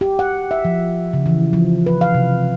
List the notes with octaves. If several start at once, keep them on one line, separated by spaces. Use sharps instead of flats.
G4
F#5
E5
F3
C#3
E3
F3
B4
F5
C3